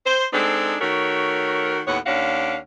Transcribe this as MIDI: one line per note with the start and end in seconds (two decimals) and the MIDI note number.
0.06 0.26 72
0.33 0.76 56
0.33 0.76 60
0.33 0.76 62
0.33 0.76 63
0.33 0.76 69
0.81 1.81 51
0.81 1.81 57
0.81 1.81 66
0.81 1.81 70
0.81 1.81 73
1.88 1.99 39
1.88 1.99 45
1.88 1.99 59
1.88 1.99 73
1.88 1.99 78
2.06 2.58 39
2.06 2.58 61
2.06 2.58 62
2.06 2.58 77
2.06 2.58 78